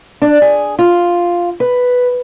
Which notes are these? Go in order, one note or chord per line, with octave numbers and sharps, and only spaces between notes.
D4
G#4
F4
B4